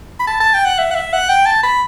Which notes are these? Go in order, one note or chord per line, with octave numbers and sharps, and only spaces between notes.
B5
A5
A5
G5
F#5
E5
F#5
E5
F#5
G5
A5
B5